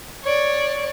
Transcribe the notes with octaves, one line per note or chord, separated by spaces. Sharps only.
C#5 D5